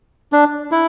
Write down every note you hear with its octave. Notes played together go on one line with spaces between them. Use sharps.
D4
E4